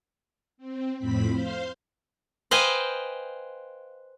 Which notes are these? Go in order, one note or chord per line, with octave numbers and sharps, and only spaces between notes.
C4
F2 A2 C4 B5 B6
C5 F5 C6
B4 C5 D#5 F5 G5 G#5